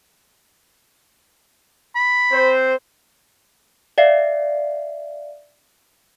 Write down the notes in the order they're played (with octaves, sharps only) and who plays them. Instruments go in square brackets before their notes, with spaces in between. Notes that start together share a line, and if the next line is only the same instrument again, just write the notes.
[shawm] B5
[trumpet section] C4 C5
[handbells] D5 E5 F5 C7